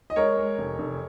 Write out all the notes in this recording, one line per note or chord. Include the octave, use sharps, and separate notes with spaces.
D#5
G#3 A#4 C#5
G#3
F1
F1